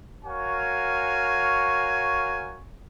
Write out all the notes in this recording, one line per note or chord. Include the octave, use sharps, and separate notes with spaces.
F#4 A#4 C#5 F5 G#5 C#6